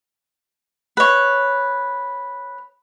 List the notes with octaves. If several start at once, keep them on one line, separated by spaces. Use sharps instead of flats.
B4 C#5